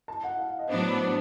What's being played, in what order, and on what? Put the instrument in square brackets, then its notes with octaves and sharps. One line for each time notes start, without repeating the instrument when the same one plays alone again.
[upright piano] A5
F#5
F5
D#5
[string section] A2 F#3 B3 D4 [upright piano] C5
[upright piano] C5
C5